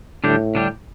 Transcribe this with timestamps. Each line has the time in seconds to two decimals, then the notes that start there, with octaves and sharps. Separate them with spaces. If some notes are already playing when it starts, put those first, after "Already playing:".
0.24 A2 D3 G3 D4 G4
0.55 D3 G3 D4 G4